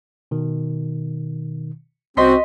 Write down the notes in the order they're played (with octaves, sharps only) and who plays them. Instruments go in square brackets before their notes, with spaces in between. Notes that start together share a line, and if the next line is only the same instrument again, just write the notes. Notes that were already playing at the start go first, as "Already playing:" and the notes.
[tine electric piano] B2 D#3
[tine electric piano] C2 C5 [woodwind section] C4 C#4 F#4 [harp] D#5 C6 B6